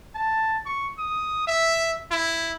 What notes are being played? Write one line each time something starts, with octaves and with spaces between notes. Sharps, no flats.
A5
C#6
D#6
E5
E4